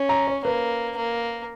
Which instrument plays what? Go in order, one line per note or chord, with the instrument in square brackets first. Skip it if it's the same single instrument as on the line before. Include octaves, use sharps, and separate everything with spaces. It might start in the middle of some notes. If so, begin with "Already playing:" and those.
Already playing: [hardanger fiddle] C#4
[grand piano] A#5
C#5
[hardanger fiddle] A#3 [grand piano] B4
[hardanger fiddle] A#3